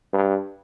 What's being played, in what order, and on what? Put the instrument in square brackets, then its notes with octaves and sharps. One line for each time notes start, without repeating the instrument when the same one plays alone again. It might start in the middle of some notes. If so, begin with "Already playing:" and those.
[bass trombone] G2